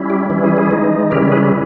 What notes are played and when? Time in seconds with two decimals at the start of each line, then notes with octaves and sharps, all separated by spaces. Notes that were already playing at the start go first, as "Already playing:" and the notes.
Already playing: G3 C#4 E4
0.10 G4
0.30 E3 G3 C#4 E4
0.44 G#4
0.57 G#4
0.71 E3 G#3 D#4
1.11 C#3 G3 C#4 E4 G4 A#4
1.31 G#4 B4